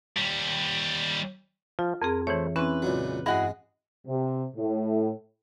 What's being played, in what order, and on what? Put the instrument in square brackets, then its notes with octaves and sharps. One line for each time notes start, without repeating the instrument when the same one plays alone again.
[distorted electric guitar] D#2 G3
[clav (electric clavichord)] F3 [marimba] F4
[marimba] F2 C4 G#4 [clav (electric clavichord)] A#4
[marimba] E3 C#5 [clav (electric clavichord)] A3 C5
[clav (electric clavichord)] E3 [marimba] C4 C#4 [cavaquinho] B4
[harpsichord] C#2 A#2 F#3
[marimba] G2 [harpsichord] G#3 [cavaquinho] E4 F#4 G#4
[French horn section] C3
A2